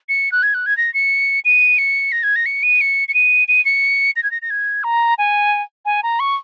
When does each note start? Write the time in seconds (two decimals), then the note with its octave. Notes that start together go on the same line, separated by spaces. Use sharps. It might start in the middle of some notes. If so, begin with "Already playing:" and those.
0.09 C#7
0.32 F#6
0.43 G#6
0.54 F#6
0.66 G#6
0.77 A#6
0.94 C#7
1.45 D#7
1.78 C#7
2.12 A#6
2.23 G#6
2.36 A#6
2.46 C#7
2.63 D#7
2.81 C#7
3.08 C#7
3.14 D#7
3.48 D#7
3.65 C#7
4.16 A#6
4.23 G#6
4.31 A#6
4.42 A#6
4.50 G#6
4.84 A#5
5.18 G#5
5.85 G#5
6.03 A#5
6.20 C#6